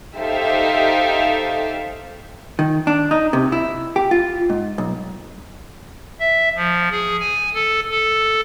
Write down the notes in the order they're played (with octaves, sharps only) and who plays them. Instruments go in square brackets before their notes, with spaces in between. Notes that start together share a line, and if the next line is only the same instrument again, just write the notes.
[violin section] D#4 G4 A4 C5 E5 F5
[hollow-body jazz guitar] D#3
D4
D#4
C3
E4
G4
F4
G#2
B1
[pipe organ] E5
F3
G#4
G#5
A4
A4